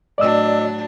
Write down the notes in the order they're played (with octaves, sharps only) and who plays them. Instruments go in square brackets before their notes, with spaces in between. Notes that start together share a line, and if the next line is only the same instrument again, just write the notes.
[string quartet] A2 F#3 D4 [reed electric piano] D5 D#5 E6